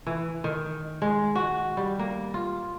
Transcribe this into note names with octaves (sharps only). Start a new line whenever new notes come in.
E3
D#3
G#3
F#4
G3
A#3
F4